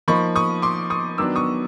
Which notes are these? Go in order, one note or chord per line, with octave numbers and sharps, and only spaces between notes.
F3 A#3 D#4 B5 C#6
C#6 D#6
C6 D6
C#6 D#6
D#3 F#3 B3 D4 D6 E6
C#6 D#6